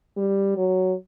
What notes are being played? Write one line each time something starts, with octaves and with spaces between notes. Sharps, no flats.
G3
F#3